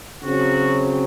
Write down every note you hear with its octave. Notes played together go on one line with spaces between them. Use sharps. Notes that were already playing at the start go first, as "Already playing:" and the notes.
C#3 F#3 C4 F#4